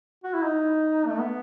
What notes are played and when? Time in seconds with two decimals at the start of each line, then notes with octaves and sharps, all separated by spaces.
0.24 F#4
0.34 E4
0.44 D#4
1.07 A3
1.19 B3